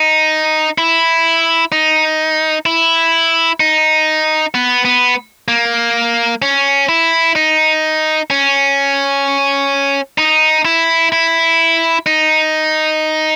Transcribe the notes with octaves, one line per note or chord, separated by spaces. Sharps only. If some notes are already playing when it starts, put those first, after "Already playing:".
Already playing: D#4
E4
D#4
E4
D#4
B3
B3
A#3
C#4
E4
D#4
C#4
D#4
E4
E4
D#4